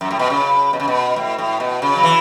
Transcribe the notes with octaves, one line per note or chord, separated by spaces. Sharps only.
F#2
A2
B2
C#3
B2
C#3
B2
A2
A2
B2
C#3
F#3
E3